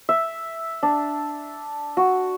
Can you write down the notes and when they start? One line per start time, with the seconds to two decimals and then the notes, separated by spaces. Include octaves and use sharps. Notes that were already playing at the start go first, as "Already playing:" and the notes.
0.09 E5
0.83 D4
1.97 F#4